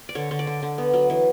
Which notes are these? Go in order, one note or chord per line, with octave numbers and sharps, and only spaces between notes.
D5
D3 C#5
D3
D5
D3
D3
B3
F#3
E3